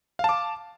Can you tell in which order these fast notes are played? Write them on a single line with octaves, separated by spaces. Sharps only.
F5 A5 D6